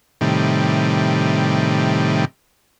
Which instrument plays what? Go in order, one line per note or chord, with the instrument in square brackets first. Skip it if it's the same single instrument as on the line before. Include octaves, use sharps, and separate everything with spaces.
[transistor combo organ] A2 C3 D#3 G3